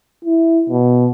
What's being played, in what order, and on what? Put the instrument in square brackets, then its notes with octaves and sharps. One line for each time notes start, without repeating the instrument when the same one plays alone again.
[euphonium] E4
B2